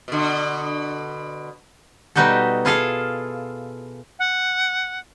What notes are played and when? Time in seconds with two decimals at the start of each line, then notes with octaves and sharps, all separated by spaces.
0.08 B2 D3
2.16 B2 G3 D#4 F#4 G4 A4
2.65 E4 F4 G#4 A4 F5
4.19 F#5